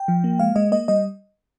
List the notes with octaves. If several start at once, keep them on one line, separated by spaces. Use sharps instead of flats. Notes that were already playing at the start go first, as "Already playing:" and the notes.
Already playing: G5
F3
A#3
G#3 F5
G#3 D#5
A#3 D#5
G3 D#5